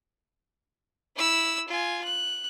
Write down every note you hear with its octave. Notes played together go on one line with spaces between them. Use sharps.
E4 E6
F4 G#5
F#6